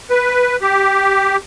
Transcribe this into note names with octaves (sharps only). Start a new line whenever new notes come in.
B4
G4